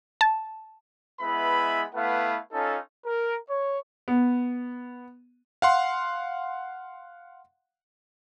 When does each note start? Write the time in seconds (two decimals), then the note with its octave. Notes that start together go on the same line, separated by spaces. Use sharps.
0.21 A5
1.21 G#3 B3 E4 B4 E5 B5
1.94 A3 B3 E4 B4 F5 F#5
2.52 C#4 D#4 F4 A4
3.05 A#4
3.48 C#5
4.08 B3
5.62 F5 F#5 C6